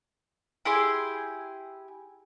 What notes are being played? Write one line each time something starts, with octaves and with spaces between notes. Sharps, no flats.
E4 G4 G#4 C6